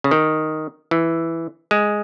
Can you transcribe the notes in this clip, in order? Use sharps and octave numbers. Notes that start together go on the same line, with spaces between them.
C#3
D#3
E3
G#3